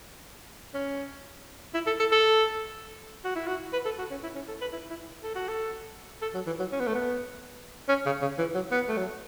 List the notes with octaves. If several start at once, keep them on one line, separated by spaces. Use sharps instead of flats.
C#4
E4
A4
A4
A4
F#4
E4
F#4
B4
A4
F#4
C#4
E4
C#4
A4
B4
E4
E4
A4
F#4
A4
A4
F#3
E3
F#3
C#4
B3
A3
B3
C#4
C#3
C#3
E3
F#3
B3
A3
F#3